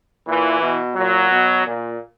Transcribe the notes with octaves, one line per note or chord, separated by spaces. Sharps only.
A#2 E3
B2
A#2 F#3
B2
A#2